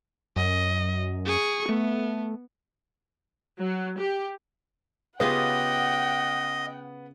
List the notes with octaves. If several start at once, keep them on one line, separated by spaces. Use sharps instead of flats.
F#2 D#5
G#4 C#6
A3 B3
F#3
G4
C#3 B3 F4 G4 D#5 F#5 G5